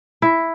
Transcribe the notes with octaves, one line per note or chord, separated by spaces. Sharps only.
E4